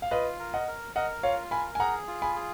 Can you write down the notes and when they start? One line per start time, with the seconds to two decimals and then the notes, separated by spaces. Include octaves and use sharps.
0.02 F5
0.11 F4 B4 D#5
0.39 A#4
0.54 D#5 F#5
0.67 A#4
0.96 A#4 D#5 F#5
1.23 F4 C#5 F5
1.51 A#4 G#5 B5
1.75 G#5
1.80 G#4 F#5 A#5
2.08 F4
2.22 G#5 B5
2.36 G#4